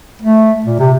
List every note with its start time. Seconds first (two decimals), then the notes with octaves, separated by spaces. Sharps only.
0.22 A3
0.66 A#2
0.79 C3